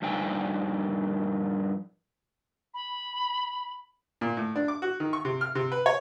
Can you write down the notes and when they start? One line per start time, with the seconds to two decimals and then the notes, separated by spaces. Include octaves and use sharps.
0.02 G2 F3 D#4 G5 G#5
2.74 B5
4.21 A#2
4.37 A2
4.56 D4
4.68 D6
4.82 F#4
5.00 D#3
5.13 C#6
5.25 C3
5.41 F6
5.55 C3
5.72 B4
5.86 C#5